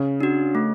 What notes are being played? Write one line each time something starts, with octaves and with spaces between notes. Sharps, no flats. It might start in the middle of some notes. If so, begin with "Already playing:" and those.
Already playing: C#3
D4 F#4
A3